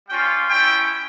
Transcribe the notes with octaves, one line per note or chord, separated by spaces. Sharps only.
G3 C#4 F4 G5
G#3 C#4 E4 G5